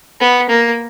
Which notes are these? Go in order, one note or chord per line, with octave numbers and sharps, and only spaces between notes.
B3
A#3